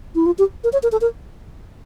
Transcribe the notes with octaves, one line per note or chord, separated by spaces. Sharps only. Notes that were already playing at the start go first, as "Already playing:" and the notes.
E4
F4
G4
A#4
C#5
A#4
A4
A#4